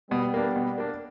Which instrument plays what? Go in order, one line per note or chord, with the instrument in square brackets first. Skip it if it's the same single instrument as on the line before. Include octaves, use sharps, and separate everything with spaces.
[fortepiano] B2 [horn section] G3 B3
[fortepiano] A#3 D4
B2
A#3 D4